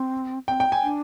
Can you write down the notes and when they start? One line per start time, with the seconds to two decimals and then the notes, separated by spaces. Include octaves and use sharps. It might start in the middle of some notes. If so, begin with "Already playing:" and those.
Already playing: C4
0.48 C4 G5
0.60 G5
0.72 G#5
0.83 D4